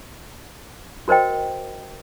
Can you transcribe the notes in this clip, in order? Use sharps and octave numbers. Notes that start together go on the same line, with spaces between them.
F#4 A#4 C5 D#5 G5